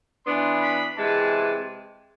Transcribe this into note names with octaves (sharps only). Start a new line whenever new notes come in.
E3 B3 D4 C6
B5
C3 E3 G#3 A5